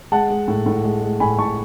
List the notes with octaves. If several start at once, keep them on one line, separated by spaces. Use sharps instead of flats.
G#3 F#5 A5
G#3
A2
A2
G#3
G#3
A2 G#5 B5
A2 A5 C#6